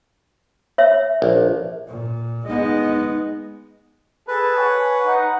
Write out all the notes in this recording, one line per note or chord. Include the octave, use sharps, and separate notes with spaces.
C#5 E5
A#1
A#2
G#3 B3 D#4 D#5
G#4 A4 B4 A5
C#5 F#5 G#5
D#4 F#5